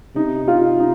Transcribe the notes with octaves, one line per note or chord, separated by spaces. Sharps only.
C3 D#4
F4
D#4